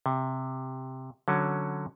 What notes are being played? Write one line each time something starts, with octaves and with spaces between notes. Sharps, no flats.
C3
D3 F#3 C#4